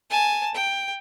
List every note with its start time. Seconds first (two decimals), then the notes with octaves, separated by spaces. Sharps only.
0.10 G#5 A5
0.54 G5